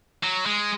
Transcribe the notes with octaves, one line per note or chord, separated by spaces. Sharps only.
F#3
G#3